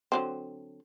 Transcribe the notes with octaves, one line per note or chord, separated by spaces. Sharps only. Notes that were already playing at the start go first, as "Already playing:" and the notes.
D3 F#3 C4